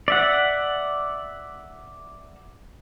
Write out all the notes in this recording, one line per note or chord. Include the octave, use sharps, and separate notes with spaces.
D5 E5 F#5